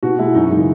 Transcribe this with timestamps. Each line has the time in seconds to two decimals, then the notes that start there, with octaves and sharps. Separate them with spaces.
0.03 B2 F#4
0.19 G#3 E4
0.35 F#2 D#4
0.51 C#3 E3 G#3